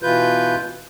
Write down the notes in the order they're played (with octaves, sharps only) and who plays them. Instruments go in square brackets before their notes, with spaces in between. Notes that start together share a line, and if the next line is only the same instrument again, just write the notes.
[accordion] B2 E3 F4 B4 G6